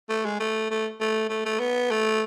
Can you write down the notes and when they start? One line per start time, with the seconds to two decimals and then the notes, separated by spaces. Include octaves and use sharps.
0.09 A3
0.25 G#3
0.40 A3
0.70 A3
1.01 A3
1.30 A3
1.45 A3
1.60 B3
1.91 A3